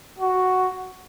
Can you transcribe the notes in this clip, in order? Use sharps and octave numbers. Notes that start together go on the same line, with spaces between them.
F#4